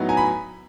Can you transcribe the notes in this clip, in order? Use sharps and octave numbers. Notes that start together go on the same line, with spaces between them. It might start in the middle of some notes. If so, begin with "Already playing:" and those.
Already playing: A2 F#3 B3 D#4
G#5 A#5
B5